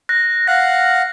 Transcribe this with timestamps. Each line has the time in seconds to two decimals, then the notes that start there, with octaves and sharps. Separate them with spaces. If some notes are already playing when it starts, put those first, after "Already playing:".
0.09 F#6 A#6
0.48 F5 F#5 F#6 A#6